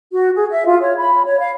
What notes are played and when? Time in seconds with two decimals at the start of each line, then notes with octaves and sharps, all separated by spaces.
0.13 F#4
0.35 G#4
0.50 E5
0.66 F4
0.81 C#5
0.98 B5
1.25 C#5
1.39 F5